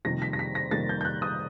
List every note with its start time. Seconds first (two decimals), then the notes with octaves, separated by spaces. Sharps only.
0.05 F2 C3 D#3 G3 A#3 A#6
0.22 B6
0.33 A#6
0.39 B6
0.55 A#6
0.71 F2 C3 D#3 G3 A#3 A6
0.89 G6
1.01 G6
1.05 F#6
1.22 D#6